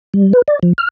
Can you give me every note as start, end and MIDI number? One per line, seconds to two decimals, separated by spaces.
0.14 0.33 55
0.33 0.42 71
0.48 0.59 74
0.63 0.73 53
0.78 0.88 89